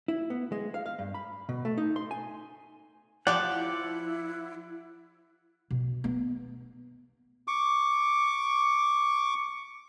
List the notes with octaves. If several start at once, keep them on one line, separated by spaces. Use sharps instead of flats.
E4
B3
G#3
F5
F5
G2
B5
B2
A3
D#4
C6
G#5
F3 G4 D5 F#5 D6
E4
B2
B3
C#6 D6